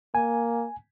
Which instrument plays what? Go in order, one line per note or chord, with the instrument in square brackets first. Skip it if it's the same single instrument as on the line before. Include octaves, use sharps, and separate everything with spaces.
[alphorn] A#3 [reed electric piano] G#5